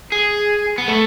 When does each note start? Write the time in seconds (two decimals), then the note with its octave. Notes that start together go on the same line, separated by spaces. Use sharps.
0.12 G#4
0.78 B3
0.88 A3